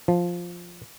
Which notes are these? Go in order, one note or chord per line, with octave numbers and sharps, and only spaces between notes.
F3